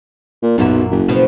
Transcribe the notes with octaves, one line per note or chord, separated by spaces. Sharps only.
A#2
B1 F#2 A#2 E4
F#1
B2 F3